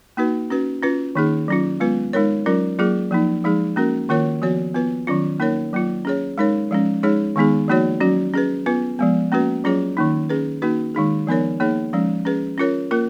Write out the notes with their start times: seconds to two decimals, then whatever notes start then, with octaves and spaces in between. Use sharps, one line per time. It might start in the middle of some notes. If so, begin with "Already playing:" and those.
0.17 A#3 D#4 F#4 B4
0.50 C#4 F#4 B4
0.82 C#4 F4 B4
1.15 D#3 A#3 D#4 G#4
1.48 F#3 C#4 F4
1.80 G#3 B3 F4 B4
2.13 G#3 D#4 A#4 C#5
2.46 F#3 C#4 F4 A#4
2.79 F#3 A#3 F4 G#4
3.11 F3 A#3 D#4
3.44 F3 G#3 D#4 G#4
3.76 A#3 C#4 F#4 A#4
4.09 D#3 A#3 F4 A#4 C#5
4.42 F3 B3 F#4 C#5
4.75 B3 F4 B4
5.07 D#3 F#3 C#4 F4
5.40 A#3 D#4 A#4 C#5
5.73 F#3 A#3 F4
6.05 C#4 G#4 C#5
6.38 G#3 D#4 A#4 C#5
6.71 F3 G#3 C#4
7.03 G#3 D#4 G#4 C#5
7.36 D#3 G#3 B3 D#4 G#4
7.68 F3 A#3 D#4 F#4 C#5
8.01 F#3 C#4 F#4
8.34 C#4 G#4 B4
8.66 B3 F4 B4
8.99 F3 G#3 B3
9.32 A#3 C#4 F#4 B4
9.64 F#3 C#4 F4 G#4 C#5
9.97 D#3 A#3 D#4
10.29 C#4 G#4 B4
10.62 A#3 D#4 F#4 B4
10.95 D#3 G#3 D#4 G#4
11.27 F3 B3 D#4 A#4 C#5
11.60 A#3 D#4 G#4 C#5
11.93 F3 G#3 C#4
12.25 C#4 G#4 B4
12.58 C#4 F4 A#4 C#5
12.91 A#3 F4 A#4